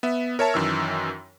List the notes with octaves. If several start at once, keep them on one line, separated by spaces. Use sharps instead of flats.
B3 E5
A#4 C#5 E5 A5
F#2 D#3 E3 E6